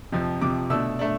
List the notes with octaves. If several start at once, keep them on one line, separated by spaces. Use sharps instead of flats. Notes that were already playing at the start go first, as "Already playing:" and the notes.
F2 C3 F3
F2 C3 F3 D6
B2 A3 D4 E6
A3 D4